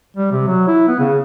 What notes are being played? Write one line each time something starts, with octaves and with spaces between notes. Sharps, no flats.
G3
C3
F#3
E4
B3
C#3